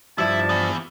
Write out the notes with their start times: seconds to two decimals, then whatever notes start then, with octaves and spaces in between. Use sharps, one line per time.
0.18 G2 F3 G3 E4 E5 A5
0.49 E3 B3